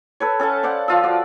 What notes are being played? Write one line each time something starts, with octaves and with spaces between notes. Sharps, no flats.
A4 B4 C#5
C#4 A4 F#5 A5
C5 D5 F5 F#5
F3 F4 E6
F#4 D5